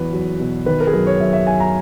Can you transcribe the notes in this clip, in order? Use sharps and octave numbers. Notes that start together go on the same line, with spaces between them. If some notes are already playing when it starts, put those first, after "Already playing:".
Already playing: E2 F#3 B4
F#3
B2
D#3 B4
A#4
G#4
F#2 A#4
C#5
F#2 E5
E5
F#2 G#5
A#5